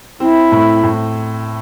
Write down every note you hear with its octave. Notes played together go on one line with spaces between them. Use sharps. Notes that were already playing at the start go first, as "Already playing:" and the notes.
C4 E4
A2
A2